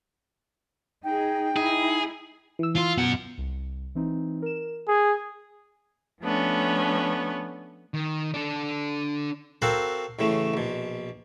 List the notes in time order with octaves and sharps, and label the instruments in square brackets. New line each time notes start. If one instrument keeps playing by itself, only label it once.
[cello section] D#4 G#4 [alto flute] G5
[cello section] D#4 E4 [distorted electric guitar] G#4
[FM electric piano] E3 E6
[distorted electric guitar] F4
[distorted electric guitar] F#2 F#5 [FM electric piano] B2
[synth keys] C2
E3 C4 D#4
A#4 E7
[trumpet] G#4 [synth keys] G#6
[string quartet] F3 A3 B3 C#4 D4
[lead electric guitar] D#3
D4 A4
[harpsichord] C4 F#4 A4 A#4 F5 F#5
A1 A2 C#3 A3
A#1 B2